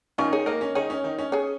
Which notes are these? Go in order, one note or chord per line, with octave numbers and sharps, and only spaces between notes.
D#3 C#4 D#4 F4
G#4 C#5
A#3 A#4 D#5
C#4
D#3 D#4 G#4 C#5
C#4
D#3 D#4
C#4
G#4 C#5